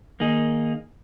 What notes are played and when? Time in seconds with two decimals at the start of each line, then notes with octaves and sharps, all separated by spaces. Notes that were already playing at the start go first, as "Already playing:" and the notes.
0.20 D#3 A#3 D#4 G#4